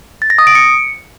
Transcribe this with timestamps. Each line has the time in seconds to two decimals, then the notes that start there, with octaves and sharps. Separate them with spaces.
0.22 A6
0.30 A#6
0.38 D#6
0.47 D7
0.55 C#7